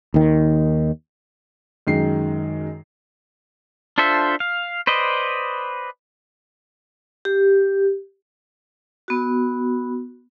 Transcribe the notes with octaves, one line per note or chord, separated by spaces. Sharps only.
D#2 D#3
F#2 D#3 G#3 C7
D4 F4 A4 C5 E5
F5
B4 C5 D5 D#5
G4
B3 F#4